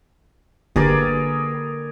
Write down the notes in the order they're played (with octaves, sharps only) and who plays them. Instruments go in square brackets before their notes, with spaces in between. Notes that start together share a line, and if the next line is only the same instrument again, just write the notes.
[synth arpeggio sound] G1 [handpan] D3 A#3 [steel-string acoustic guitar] G4 B4 [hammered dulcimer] G#4 A#4 D5